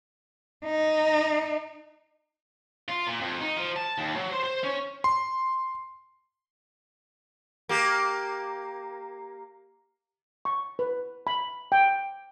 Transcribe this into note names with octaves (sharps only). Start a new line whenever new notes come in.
D#4
F4
A#2
F2
D#4
F3
A5
D#2
F#3
C5
C5
C#4
C6
A#3 G4
C#6
B4
B5
G5